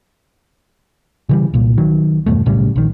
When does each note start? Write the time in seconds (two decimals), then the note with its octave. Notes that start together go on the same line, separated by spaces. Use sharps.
1.29 C#3 E3 G3
1.54 C2 A#2
1.78 D#3 F#3
2.26 E2 G2 B2 A3
2.46 B1 A2 C#3 G3
2.76 A#1 D#3